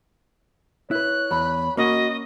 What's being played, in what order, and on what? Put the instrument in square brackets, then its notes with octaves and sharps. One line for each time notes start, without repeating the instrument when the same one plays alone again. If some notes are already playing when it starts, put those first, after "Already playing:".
[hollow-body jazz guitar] E4 B4 [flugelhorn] C#5 [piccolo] F#6
[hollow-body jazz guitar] E2 [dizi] B5
[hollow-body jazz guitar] A#3 C#4 [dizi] F#4 [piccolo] D#5